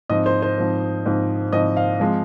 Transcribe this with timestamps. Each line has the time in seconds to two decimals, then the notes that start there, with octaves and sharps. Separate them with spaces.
0.09 G#2 F3 C4 D#5
0.26 C5
0.42 C5
0.58 G#2 F3 C4
1.06 G#2 F3 C4
1.52 G#2 F3 C4 D#5
1.77 F5
2.00 F3 G#3 C4